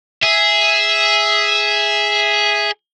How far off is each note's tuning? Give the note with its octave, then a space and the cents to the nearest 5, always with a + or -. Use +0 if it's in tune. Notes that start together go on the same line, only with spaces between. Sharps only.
G#4 +0 E5 -5